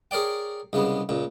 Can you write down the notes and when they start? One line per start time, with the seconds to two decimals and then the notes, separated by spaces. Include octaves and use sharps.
0.11 G#4 A#4 C#5 D5 G5
0.73 C2 C#3 G#3 B3
1.09 C#2 A#2